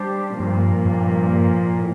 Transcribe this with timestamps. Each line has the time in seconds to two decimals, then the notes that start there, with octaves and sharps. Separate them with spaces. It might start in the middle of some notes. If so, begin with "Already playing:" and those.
Already playing: G3 D4 G4 C5
0.39 G2 A#2 F3 A#3
0.85 G2
1.78 A2